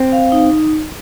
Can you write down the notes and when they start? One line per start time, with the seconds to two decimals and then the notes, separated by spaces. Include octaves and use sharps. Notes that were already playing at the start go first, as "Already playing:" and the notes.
Already playing: C4
0.12 F5
0.32 D#4